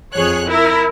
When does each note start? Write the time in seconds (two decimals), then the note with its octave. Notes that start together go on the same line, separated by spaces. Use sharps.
0.14 F2 G#4 C#5 F#6
0.48 E4 A#4